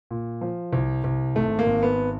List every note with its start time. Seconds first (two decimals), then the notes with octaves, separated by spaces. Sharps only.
0.11 A#2
0.41 F3
0.73 C2
1.04 C2
1.36 G#1 A3
1.59 A#3
1.66 G#1
1.83 B3